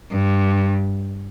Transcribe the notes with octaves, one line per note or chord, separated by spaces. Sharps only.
G2